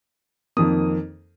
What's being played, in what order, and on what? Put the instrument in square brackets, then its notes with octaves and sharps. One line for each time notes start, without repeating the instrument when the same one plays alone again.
[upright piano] F2 D#3 A#3 D#6